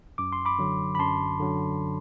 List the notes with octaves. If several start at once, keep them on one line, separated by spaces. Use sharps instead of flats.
F#2 D6
C6
B5 D6
D3 F#3
B5
F#2 A5 C6
D3 F#3